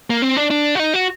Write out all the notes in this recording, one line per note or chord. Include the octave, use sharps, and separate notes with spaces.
A#3
C4
D4
D4
F#4
D#4
F#4